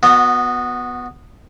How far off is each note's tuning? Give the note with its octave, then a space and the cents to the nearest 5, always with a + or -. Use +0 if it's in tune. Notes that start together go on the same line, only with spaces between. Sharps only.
B3 +0 F#4 -25 D#5 -15